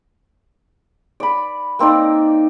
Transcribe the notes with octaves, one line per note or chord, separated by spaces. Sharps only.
D5 B5
A#3 C4 D#4 D5